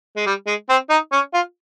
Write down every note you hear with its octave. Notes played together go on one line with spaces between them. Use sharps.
G#3
G3
G#3
C4
D#4
C#4
F4